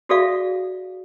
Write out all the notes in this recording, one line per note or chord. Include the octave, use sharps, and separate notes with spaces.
F#4 G#4 A4 D5 E5 F5